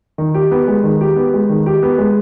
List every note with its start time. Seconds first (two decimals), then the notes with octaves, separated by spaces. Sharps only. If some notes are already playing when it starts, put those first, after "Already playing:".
0.18 D#3
0.34 G4
0.51 B3
0.67 G#3
0.83 D#3
1.01 G4
1.16 B3
1.34 G#3
1.49 D#3
1.66 G4
1.83 B3
1.98 G#3